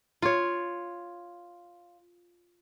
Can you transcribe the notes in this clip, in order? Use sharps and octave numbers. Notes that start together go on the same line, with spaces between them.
F4 C#5